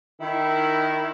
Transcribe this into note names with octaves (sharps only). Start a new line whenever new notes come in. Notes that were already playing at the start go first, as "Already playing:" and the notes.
D#3 E4